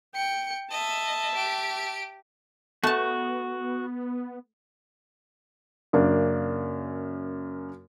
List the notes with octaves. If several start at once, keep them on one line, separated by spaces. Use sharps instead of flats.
G5 C#7
D#5 E5 A5
G4 D7
A3 B3 F#4 A5
F#2 C#3 A#3 D4